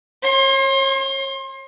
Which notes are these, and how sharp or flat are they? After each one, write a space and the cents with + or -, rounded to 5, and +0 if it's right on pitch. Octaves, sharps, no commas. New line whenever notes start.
C#5 -35 C6 +30